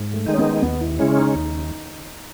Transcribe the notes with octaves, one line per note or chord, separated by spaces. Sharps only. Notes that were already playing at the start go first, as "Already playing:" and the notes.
Already playing: G#2
A3
D#3 G#3 D#4
C#4
B3
D#2 B3
E4
C#3 G#3 C#4 E4
D#4
D#2